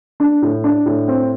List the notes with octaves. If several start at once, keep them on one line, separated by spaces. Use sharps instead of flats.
D4
A2
D4
A2
C4